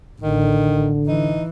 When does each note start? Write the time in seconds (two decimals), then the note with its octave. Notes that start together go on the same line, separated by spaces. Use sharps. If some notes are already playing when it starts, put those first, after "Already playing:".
0.21 A1 D3 D#3
1.07 E3 D#4